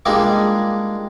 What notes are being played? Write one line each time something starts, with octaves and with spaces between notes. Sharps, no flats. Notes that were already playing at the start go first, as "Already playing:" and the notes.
G3 G#3 A#3 D4 D#4 F4